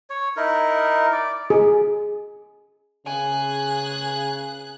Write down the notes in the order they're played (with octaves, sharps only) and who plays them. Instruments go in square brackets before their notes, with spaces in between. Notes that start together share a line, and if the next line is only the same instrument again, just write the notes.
[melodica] C#5
D#4 E4 A#4
D5
[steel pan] G#4
[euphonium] C#3 [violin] G#4 F#6 [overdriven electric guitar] G#5